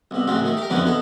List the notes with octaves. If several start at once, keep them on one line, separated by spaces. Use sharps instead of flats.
C2 B2
A1 C#3 F#3 C4
D#3 A3
G4 A#4
F2 G#2 D3 E3 B3 C#4
B2 B3 A4